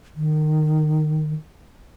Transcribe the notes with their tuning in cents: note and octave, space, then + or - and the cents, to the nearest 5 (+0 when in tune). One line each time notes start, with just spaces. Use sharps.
D#3 -20